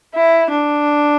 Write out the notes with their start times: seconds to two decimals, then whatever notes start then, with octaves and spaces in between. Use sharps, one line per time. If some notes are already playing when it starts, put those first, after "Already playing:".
0.15 E4
0.50 D4